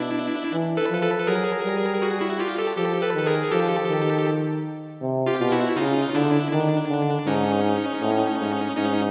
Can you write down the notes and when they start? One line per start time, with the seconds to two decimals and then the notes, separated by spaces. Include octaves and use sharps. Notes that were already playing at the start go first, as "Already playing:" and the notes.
Already playing: B2 D4 E4
0.52 E3
0.77 A4 B4
0.89 F3
1.02 A4 B4
1.27 F#3 G#4 A#4
1.65 G3
2.02 F#4 G#4
2.21 E4 F#4
2.39 F4 G4
2.59 G4 A4
2.77 F3 G4 A4
3.02 A4 B4
3.14 D#3
3.26 G#4 A#4
3.51 F3 G4 A4
3.89 D#3
5.02 C3
5.26 F4 G4
5.39 B2 F4
5.52 E4 F#4
5.76 C#3 D#4 F4
6.14 D3 D4 E4
6.52 D#3 D4
6.89 D3
7.26 G#2 C#4 D#4
8.02 A2
8.40 G#2
8.77 G#2 C#4 D#4